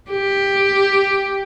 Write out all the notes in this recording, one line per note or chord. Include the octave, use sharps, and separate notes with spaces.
G4